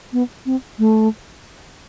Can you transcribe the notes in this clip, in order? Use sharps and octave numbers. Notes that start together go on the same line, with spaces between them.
B3
C4
A3